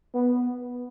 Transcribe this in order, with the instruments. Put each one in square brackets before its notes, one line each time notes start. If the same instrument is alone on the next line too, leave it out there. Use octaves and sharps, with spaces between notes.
[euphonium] B3